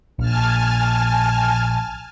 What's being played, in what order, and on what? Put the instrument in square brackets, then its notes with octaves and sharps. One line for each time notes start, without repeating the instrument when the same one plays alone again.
[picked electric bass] A#1 [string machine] G#5 A5 F6